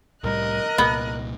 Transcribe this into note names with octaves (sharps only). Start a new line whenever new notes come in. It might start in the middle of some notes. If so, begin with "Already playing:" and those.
C2 A2 G3 A#4 D#5 F#6
C2 A#2 B3